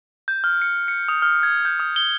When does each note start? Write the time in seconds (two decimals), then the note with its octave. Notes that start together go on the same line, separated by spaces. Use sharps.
0.28 G6
0.44 F6
0.62 C#7
0.88 C#7
1.08 D#6
1.22 F6
1.43 G#6
1.65 G6
1.80 D#6
1.96 G7